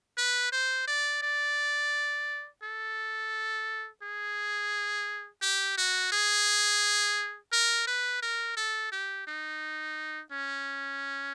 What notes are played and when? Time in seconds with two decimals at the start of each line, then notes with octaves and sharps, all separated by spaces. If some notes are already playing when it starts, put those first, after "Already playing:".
0.17 B4
0.52 C5
0.88 D5
1.22 D5
2.63 A4
4.02 G#4
5.42 G4
5.78 F#4
6.12 G#4
7.52 A#4
7.87 B4
8.22 A#4
8.57 A4
8.92 G4
9.27 D#4
10.32 C#4